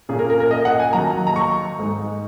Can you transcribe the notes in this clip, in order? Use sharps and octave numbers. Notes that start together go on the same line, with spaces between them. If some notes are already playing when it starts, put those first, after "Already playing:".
A#2 A#3 C#4 G#4
A#4
A#4
A#4
D#5
F#5
G#5
D#3 F#3 A#3 D#4 A#5
A#5
C#6
G#2 G#3 D#4